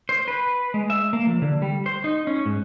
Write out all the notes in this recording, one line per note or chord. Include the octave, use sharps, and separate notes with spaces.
C5
B4
G#3
E5
A#3
F3
D3
G3
C5
D#4
C#4
G#2